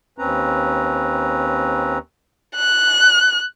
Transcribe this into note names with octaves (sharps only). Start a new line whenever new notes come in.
D#2 C4 C#4 B4 A#5
F#6